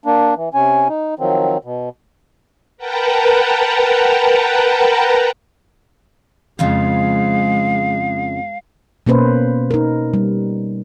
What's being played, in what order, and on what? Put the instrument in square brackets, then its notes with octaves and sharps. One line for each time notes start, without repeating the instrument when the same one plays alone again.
[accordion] A#3 D4
E3
C3 C#4 G#5
D#4
D#3 F3 F#3 C4
B2
[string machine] A#4 B4 F#5 G5 A5 A#5
[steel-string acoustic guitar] F2 C#3 F3 [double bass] G#3 [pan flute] F5
[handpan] B2 A#3 C#4 B4 C5
D#4 A#4
G3